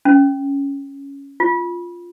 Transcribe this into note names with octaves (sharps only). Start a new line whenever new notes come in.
C#4
F4